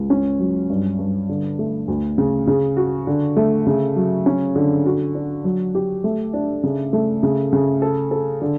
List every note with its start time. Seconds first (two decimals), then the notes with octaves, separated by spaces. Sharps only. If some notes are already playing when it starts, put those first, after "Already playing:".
Already playing: C#2
0.10 C#4
0.39 F#3
0.70 G2
0.99 G2
1.29 D3
1.59 A3
1.88 D2
2.18 C#3
2.47 C#3
2.77 F#4
3.07 D3
3.36 A3
3.66 C#3
3.96 F#3
4.26 C#4
4.56 D3
4.86 F#4
5.15 D4
5.44 F#3
5.75 G4
6.04 A3
6.34 D4
6.63 C#3
6.93 A3
7.23 C#3
7.53 C#3
7.82 A4
8.11 A4
8.42 D3